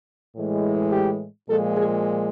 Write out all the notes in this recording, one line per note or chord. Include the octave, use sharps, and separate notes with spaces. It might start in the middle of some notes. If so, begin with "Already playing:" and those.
A2 E3 G#3
G4
A#2 F3 G#3 A4
G#4